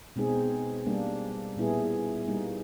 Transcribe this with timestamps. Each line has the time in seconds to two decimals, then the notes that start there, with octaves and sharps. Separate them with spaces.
0.16 B2 G#3 C4 D#4 G#4
0.86 G3 A#3 D4
1.57 A#2 G3 B3 E4 G#4
2.27 G3 A#3 D#4